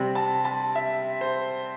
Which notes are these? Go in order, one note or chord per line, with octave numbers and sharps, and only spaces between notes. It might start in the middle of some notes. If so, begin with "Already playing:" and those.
Already playing: C3 G3 C4
A5
A5
E5
C5